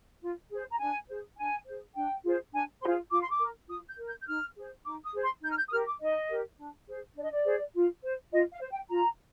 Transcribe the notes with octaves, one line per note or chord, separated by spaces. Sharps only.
F4
G#4 C5
A#5
D4 G#5
G#4 C5
D4 G#5
G#4 C5
D4 G5
F4 G#4 C5
D4 G#5
F4 G#4 C5 C6
F4 D6
C6
D6
A#4
F4 D#6
G6
A#4
G6
G6
D#4 F6
G#4 C5
D#4 D6
D#6
G#4 C5
C6
D#4 G6
F6
G6
D#6
G4 A#4 F6
D6
D#4 D#5
G4 A#4
D4
G#4 C5
D4 D5
D#5
D5
G#4 C5
F4
C5
F4 D#5
F5
C5
G5
F4 A#5